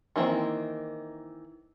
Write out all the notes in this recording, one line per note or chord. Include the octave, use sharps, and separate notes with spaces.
D#3 E3 A#3 C4 E4